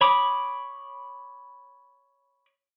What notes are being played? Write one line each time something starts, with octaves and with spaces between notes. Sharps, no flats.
C#5 B5 D6 D#6